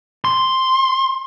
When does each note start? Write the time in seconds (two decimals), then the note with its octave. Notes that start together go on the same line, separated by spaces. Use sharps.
0.25 C6